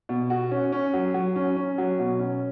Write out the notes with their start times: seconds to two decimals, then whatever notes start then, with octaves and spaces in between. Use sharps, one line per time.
0.09 B2
0.30 F#4
0.51 C#4
0.72 C#4
0.94 F#3
1.14 F#3
1.36 C#4
1.56 C#4
1.78 F#3
1.99 B2
2.19 C#4